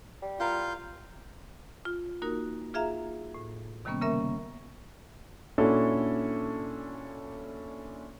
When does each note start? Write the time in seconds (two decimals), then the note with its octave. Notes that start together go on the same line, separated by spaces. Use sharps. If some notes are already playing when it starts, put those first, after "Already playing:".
0.22 G3
0.40 E4 F4 A#4 F5 F#5 G6
1.85 F4
2.22 A#3 D#4 F#4 A#4
2.74 F4 G#4 E5 F5 A#5
3.34 A2
3.85 C3 D#3 G3 A#3 B3 C#4
4.01 C#3 A#3 C#4 A#4 E5
5.58 A#2 C#4 D4 E4 F#4 A4